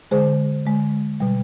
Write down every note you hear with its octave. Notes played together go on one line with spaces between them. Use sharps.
D3 G#3 G#4 C5
D3 G#3
B2 G3